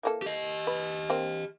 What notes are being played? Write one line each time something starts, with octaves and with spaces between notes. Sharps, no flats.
E3 A#3 A4
G4 D#5
B4
A#3 C4